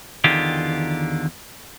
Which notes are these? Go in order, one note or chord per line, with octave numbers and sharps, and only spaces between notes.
E2 D3 D#3 F4 G4